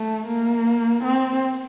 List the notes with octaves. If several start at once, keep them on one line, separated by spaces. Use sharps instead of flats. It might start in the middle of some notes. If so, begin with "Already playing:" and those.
Already playing: A3
A#3
C4